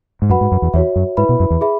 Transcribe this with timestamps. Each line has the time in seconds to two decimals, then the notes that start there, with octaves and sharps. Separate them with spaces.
0.22 G#2
0.30 F#2 F#4 B4 F#5 B5
0.41 G#2
0.52 F#2
0.62 E2
0.74 E2 F#4 C#5 E5
0.96 F#2
1.17 G#2 E4 B4 E5 B5
1.29 B2
1.40 F#2
1.50 E2
1.61 G#4 E5 B5